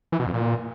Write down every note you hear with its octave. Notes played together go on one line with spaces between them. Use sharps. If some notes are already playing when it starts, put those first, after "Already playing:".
E3
B2
F2
A#2